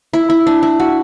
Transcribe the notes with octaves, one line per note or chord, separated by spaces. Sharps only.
E4
E4
D4
E4
F#4